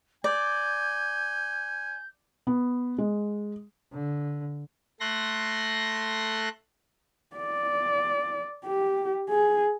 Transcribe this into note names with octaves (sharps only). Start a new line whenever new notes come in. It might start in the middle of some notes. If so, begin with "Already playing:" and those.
D5 G#5 G6
B3
G#3
D3
A3 C6 F#6 A#6
D5
G4
G#4